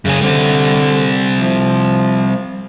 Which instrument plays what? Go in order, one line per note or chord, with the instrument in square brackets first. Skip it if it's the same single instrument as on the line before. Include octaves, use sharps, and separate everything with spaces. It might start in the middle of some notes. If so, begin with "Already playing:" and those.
[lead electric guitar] F#2 G#4 [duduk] C#3
[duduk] D3 [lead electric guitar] G3 C4
[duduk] F3